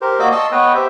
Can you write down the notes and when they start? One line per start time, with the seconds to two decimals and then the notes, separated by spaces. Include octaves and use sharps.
0.01 G4 A#4 C5
0.19 A#3 F#4 D5 D#5 D6 E6
0.32 D#5 A5 C6 C#6 D#6 E6
0.52 B3 B4 C#5 D#5 G5
0.74 G4 C5 E5